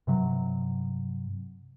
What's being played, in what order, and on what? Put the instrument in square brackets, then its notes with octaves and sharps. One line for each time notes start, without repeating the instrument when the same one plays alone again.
[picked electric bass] G2 C3 F#3